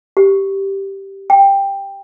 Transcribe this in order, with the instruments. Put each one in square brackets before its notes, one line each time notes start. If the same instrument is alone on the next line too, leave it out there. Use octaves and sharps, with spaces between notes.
[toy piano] G4
G5